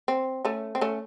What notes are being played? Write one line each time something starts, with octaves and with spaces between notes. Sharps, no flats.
C4
A3 C#4
C4
A3 C#4